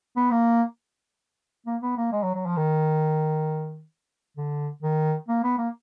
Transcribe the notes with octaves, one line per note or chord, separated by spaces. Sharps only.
B3
A#3
A#3
B3
A#3
G#3
F#3
F#3
F3
D#3
D3
D#3
A#3
B3
A#3